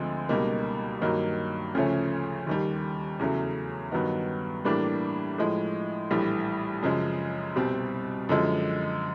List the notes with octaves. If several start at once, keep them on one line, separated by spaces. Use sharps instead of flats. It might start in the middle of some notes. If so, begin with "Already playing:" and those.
Already playing: D2 D3 F3 G#3 C4
C#2 B2 G3 A#3 D#4
G2 D#3 F#3 A#3 D#4
D2 C#3 F3 A3 C#4
D#2 D#3 G3
E2 C#3 F#3 A3
G2 D#3 F#3 B3 D#4
A2 E3 G3 A#3 D4
A2 F3 G#3
A#1 A2 E3 G3
F#2 C#3 F3 G#3
C2 B2 G3 C4
F#2 D3 F3 G#3